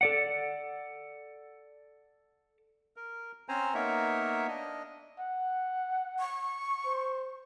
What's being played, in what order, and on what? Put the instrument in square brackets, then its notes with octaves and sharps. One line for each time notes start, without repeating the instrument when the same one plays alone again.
[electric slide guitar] A4 D5 F#5
[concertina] A#4
C4 C#4 C5 G#5 A#5
A#3 B3 D#4 A#4 C#5 E5
D4 D#5
[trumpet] F#5
[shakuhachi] C#6
[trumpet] C5